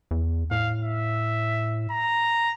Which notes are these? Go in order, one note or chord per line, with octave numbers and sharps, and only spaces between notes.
E2
A2 F5
E5
A#5